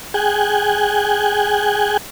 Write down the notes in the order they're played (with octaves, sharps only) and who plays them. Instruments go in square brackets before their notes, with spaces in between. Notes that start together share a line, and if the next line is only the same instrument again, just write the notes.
[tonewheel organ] G#4 G5 G#5 F#6